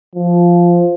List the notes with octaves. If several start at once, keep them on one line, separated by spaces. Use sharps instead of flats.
F3